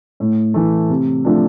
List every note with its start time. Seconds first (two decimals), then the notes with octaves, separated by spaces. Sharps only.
0.20 A2
0.54 E3 A3
0.90 C3
1.25 F3 A3 D4